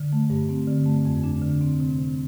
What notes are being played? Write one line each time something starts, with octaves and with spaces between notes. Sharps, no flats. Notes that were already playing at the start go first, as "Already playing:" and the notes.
Already playing: D3
A3
G2
C4
D3
A3
F2
D4
D3
C4
C3
C3